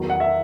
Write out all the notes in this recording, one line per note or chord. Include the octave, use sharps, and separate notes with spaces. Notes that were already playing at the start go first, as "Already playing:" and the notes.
Already playing: E2 D#3 F#3
F#5
E5